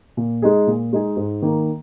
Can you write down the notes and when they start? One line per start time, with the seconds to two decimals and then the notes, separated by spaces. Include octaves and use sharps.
0.17 A#2
0.42 G#3 D#4 G#4
0.67 A#2
0.93 G#3 D#4 G#4
1.17 G#2
1.42 D#3 A#3